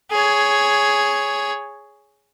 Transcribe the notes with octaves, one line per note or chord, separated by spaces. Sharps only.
G#4 C#5